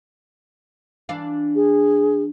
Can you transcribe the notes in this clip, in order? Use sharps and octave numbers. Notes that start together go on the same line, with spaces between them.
E3 D4 F5
G#4